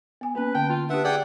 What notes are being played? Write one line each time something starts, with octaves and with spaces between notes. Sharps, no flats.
B3 G#5
A#3 C#4 B4
D3 G5 A5
F4
D4 G4 B4 E5 F#5
G#4 D5 F#5 G5